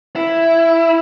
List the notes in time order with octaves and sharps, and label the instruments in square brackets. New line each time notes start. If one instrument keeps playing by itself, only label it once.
[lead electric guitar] E4